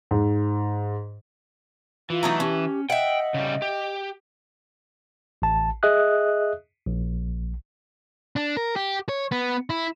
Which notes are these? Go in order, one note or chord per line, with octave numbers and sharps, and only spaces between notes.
G#2
E3 F4
F#3 A3 D#4
C#4 G4
D#5 E5 F#5 G5
C#3 G3
G4
A1 A5
G#4 D#5 E5 D#6 F#6
A#1
D4
A#4
G4
C#5
B3
E4